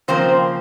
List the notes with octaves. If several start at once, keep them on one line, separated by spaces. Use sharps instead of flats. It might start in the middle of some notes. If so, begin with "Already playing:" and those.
C#3 F3 A#3 C4 C5